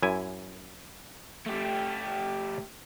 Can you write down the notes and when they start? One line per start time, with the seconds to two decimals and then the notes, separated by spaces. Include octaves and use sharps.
0.03 F#2 E4 G#5
1.46 A3 G4